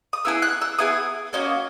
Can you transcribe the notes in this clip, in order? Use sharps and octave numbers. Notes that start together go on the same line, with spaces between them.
D#6
B3 E4 G#4 E6
F#6
E6
B3 E4 G#4 D#6
A#3 C#4 F#4 D#5